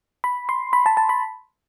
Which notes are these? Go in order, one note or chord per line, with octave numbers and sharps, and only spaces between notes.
B5
C6
B5
A5
A5
B5